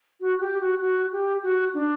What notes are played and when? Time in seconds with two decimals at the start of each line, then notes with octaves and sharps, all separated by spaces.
0.21 F#4
0.40 G4
0.61 F#4
0.81 F#4
1.12 G4
1.43 F#4
1.74 D4